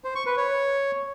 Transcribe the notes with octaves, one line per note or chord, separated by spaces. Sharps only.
C5
C#6
B4
C#5